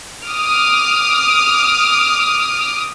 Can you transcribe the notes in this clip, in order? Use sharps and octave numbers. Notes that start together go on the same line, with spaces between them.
D6 D#6 F6